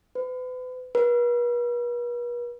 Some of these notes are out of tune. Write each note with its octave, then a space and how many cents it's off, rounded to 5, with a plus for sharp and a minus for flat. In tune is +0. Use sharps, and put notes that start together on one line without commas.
B4 +40
B4 -45